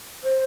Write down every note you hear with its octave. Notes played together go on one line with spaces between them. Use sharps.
C5